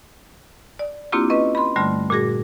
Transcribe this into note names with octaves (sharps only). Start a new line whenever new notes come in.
D5
A#3 C4 D4 E4 F4 G4
C#4 B4 D#5
B5 C6
G2 D3 G3 A3 C6 F6
A#2 F#4 G#4 A#6